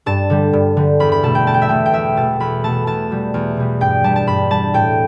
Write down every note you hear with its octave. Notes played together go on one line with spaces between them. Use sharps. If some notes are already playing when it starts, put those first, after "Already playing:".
G2 A5
D3 G3
G2
D3 G3
E2 B5
B5
B2 A3 A5
G5
E2 A5
G5
E5
B2 A3 G5
G5
E2 E5
B2 A3 A5
E2 B5
B2 A3 A5
E2 A5
B2 G3
E2
B2 G3
G2 G5
G3 A5
A5
G2 B5
G3 A5
A2 G5